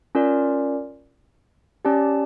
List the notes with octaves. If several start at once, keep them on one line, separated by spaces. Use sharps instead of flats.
C#4 F4 A#4 D5
C#4 G4 D5 A5